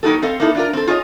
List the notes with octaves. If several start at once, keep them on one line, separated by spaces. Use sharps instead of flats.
F#3 A#3 D#4 F#4 G4 A4
C4 A4 D#5 F5
A#3 D#4 E4 A4
D4 F4 A#4
C4 A4
F4 G#4 C#5 D#5